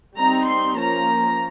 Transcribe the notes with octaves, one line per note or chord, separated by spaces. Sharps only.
G3 C4 D#4 A#5
C6
F3 A#3 C#4 A#5